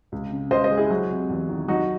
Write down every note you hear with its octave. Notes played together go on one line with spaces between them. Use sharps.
C#2
C#3
C#2 C5 D#5
C5 D#5
G#3
E4 G#4
F#3
C3
E2
D#3
F#3 D#4 F#4